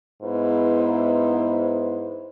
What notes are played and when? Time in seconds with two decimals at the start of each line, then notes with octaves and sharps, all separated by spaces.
0.22 G#2 B3 E4 B4 C5